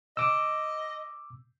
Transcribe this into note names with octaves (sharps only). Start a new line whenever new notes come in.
D#5 D6 E6